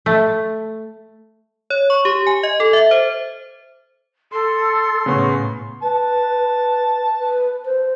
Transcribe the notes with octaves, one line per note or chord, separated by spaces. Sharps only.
A3
C#5
C#6
G4
G#5
D#5
A4
E5
C5
A4 C6
A2 C#3 B3 C#5
B4 A5
B4
C5